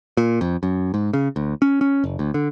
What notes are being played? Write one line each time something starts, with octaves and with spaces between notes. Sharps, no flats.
A#2
F2
F#2
G#2
C#3
D2
C#4
C#4
F#1
D2
D3